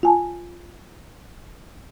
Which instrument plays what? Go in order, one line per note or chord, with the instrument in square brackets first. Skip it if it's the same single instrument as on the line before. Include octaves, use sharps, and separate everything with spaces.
[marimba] F4 G#5 A5